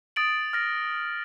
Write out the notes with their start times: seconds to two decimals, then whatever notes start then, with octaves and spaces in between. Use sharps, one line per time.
0.16 D#6 A6 D7 F#7
0.53 F6 A#6 D7